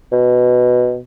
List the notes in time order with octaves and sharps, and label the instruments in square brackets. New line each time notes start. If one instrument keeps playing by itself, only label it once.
[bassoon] B2